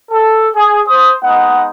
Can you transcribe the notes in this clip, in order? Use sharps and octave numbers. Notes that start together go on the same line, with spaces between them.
A4
G#4
C5 D#6
G#3 B3 D#4 F#5